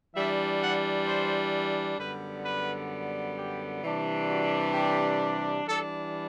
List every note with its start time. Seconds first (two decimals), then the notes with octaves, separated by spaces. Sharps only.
0.14 E3 G3 D4 E5
0.60 F#5
1.06 C5
1.98 F#2 D3 G3 B3 B4
2.45 B4
3.36 G4
3.82 C3 E3 G3 D4
4.28 F#4
4.74 G4
5.66 E3 G3 D4 A4